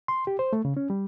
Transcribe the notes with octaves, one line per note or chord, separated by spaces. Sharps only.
C6
G4
C5
A3
C#3
C#4
G3